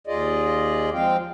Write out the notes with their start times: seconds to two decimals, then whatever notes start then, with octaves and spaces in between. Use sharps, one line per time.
0.07 D#2 F4 G#4 D5 D#5
0.94 F3 G#3 C4 F5 G5